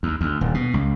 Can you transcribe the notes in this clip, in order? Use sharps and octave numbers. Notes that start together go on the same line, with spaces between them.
D#2
D2
D#1
B2
C#2